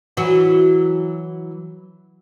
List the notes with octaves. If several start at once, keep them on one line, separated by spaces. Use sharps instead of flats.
E3 F#3 F#4